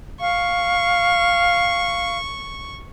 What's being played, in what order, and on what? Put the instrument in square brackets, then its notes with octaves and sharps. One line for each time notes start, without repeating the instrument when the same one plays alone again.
[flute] F5 [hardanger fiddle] C#6